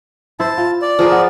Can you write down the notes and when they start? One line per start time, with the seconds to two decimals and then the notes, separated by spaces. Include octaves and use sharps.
0.40 E4 C5 A5
0.58 F4
0.82 D5
0.99 F3 G#4 A#4
1.12 B3